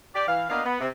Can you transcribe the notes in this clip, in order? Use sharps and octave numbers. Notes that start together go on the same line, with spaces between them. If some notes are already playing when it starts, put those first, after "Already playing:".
G4 D5
E3 F5
A#3 B3 D4 F#4 D#5 F5
B3
C3